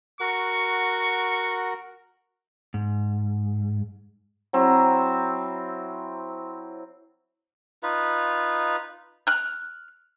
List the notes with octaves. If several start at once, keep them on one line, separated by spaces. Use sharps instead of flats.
F#4 A#4 F#5 C#6
G#2
F#3 C4 E4
D#4 F4 B4
F6 F#6